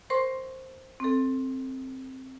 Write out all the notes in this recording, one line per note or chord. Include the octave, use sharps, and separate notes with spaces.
A#4 C5 C6 C#6
C4 A4